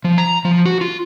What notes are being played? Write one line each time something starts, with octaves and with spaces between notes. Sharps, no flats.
F3
A#5
F3
F#4
F4